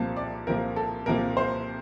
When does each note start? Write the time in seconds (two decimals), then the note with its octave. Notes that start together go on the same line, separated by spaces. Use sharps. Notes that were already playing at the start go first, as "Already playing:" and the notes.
Already playing: C2 A#2 F3 A#3 A5
0.16 D5
0.47 C2 A#2 F3 A#3 A#4
0.76 A4
1.06 C2 A#2 F3 A#3 A#4
1.37 C5